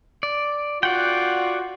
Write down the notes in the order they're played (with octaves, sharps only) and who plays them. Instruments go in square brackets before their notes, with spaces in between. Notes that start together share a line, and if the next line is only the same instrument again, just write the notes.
[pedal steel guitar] D5
[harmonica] F4 F#4 [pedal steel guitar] D5 F#5 G5